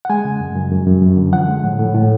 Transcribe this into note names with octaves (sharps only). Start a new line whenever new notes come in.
F#5
G#3 G#5
C#3
F#2
F#2
F#2
F#2
F#2
D3
F3 F#5
G#3
A2
A2
A2